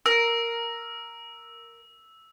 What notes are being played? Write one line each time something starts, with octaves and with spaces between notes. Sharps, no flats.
A#4 E6